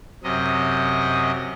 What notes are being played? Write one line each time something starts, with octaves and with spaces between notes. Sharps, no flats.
F#2 C3 D#5